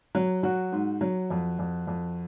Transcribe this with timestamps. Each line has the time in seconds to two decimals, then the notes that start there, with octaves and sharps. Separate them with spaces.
0.15 F#3
0.43 F#3 F#4
0.72 G#2
1.01 F#3
1.30 F2
1.59 F2
1.87 F2